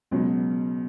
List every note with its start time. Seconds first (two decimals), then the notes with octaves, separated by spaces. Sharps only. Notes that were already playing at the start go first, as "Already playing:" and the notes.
0.11 C#2 B2 F#3